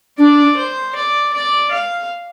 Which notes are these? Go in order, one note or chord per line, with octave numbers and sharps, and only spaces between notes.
D4 D5
C5
D5
D5
F5